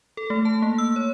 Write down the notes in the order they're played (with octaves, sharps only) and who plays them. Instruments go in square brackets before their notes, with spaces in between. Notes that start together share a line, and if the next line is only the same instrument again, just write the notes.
[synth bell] A4
A3
A5
A#3
E6
C#5